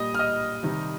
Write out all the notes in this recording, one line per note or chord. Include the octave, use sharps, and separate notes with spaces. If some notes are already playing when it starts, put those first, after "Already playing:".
Already playing: A#2 G3 D#5 D#6
F6
D#5 D#6
C3 D#3 G3